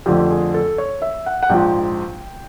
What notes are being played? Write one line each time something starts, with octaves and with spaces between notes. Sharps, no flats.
F2 D3 F3 A3 G4
G#4
A4
C#5
E5
F#5
F#5
A#1 G#2 F3 G5